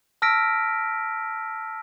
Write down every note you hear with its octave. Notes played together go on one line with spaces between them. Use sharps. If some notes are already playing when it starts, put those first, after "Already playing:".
A5 E6 F6 A#6 B6 D7